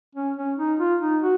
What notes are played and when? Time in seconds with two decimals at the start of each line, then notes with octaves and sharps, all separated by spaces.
0.15 C#4
0.37 C#4
0.58 D#4
0.80 F4
1.01 D#4
1.22 F#4